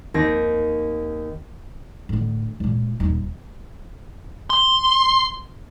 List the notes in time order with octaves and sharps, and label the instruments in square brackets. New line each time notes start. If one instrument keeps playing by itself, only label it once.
[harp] D#2 C4 G#6 A#6
[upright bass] A2 D3
C#2 A#2
D#1 D#4
[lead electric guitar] C6